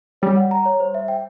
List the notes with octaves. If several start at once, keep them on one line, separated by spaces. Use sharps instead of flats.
G3 C#5
F#5
A#5
C#5
C5
E5
G5